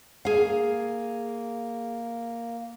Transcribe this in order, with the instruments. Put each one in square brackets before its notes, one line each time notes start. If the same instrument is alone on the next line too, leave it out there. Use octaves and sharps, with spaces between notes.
[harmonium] A#3 [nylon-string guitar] G#4 F5